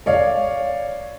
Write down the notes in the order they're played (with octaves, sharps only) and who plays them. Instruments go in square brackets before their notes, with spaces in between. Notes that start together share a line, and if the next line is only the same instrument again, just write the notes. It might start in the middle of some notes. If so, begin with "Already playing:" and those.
[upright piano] C#5 D5 F5